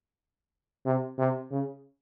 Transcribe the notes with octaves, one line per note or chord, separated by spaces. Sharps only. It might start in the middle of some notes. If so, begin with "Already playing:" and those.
C3
C3
C#3